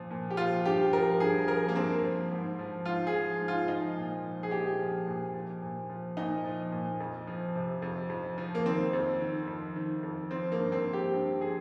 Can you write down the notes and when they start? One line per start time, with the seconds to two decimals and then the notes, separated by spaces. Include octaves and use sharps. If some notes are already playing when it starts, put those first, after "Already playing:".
Already playing: A#2 F3
0.11 A#2
0.31 G4
0.37 F3 F4
0.66 G2 G4
0.93 F3 A#4
1.20 G2 G#4
1.48 F3 A#4
1.69 A#3
1.76 G2 C4
2.03 F3
2.32 G#2
2.59 F3
2.85 G#2 F4
3.07 G#4
3.14 F3
3.41 G#2
3.48 F4
3.68 F3 D#4
3.97 A#2
4.24 F3
4.43 G#4
4.51 A#2 G4
4.79 F3
5.06 A#2
5.34 F3
5.62 A#2
5.90 F3
6.17 A#2 D#4
6.44 F3
6.72 A#2
7.00 F2
7.27 F3
7.55 C3
7.82 F2
8.10 F2
8.38 F3
8.55 A#3
8.65 D#3 C4
8.93 F2
9.21 D#3
9.47 F2
9.76 D#3
10.03 F2
10.30 F3 C4
10.52 A#3
10.58 G2
10.72 C4
10.86 F3
10.93 G4
11.13 G2
11.41 F3 G#4